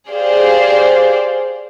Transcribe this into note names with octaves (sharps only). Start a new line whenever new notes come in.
G4 G#4 C5 D5 F5